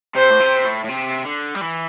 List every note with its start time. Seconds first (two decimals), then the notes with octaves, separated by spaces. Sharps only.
0.15 C3 C5
0.30 A2
0.40 C3
0.65 A2
0.84 A2
0.89 C3
1.25 D3
1.55 G3
1.61 E3